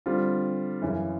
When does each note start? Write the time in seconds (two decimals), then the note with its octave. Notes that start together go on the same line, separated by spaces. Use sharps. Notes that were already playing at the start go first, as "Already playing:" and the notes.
0.06 D3 G3 C4 F4
0.82 F#2 C#3 E3